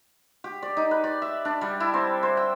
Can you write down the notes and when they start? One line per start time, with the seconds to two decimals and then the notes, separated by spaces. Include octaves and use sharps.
0.44 G4
0.63 D5
0.77 D#4
0.91 B4
1.04 D5
1.22 E5
1.45 D4
1.61 G3
1.80 E4
1.94 C4
2.23 C5
2.37 G5